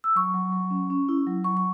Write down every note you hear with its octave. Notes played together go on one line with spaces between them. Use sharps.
E6
F#3 C#6
F#3
F#3
C#4
C#4
E4
F#3
F#3 C#6
C#6